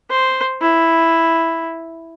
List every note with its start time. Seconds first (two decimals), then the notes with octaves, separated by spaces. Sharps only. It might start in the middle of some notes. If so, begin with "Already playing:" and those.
0.10 C5
0.61 E4